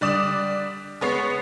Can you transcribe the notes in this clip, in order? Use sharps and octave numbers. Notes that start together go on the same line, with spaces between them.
D3 G3 D5 D#6 E7
G#3 B3 C#5 C7